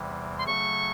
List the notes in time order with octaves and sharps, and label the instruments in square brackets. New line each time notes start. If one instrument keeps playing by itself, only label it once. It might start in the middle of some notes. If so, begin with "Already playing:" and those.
Already playing: [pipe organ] E2 C3 E3 G3
[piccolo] C6
[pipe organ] C#3 F#3 A3 [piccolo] C#6